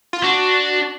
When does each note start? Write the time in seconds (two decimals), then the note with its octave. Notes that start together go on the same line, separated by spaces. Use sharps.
0.13 F4
0.24 D4 F#4